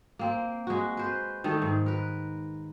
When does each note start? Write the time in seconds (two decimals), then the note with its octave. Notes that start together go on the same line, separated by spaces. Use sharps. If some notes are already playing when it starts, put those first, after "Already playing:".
0.19 A#3 C4
0.67 G#3 F#4
0.97 B4 C5
1.44 D#3 G3 A3
1.62 G#2
1.86 A#4 B4